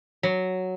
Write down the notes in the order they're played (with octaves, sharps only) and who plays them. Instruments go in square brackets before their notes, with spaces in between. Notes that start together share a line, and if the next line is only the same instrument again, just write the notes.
[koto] F#3